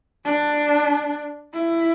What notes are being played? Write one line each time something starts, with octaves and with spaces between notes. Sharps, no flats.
D4
E4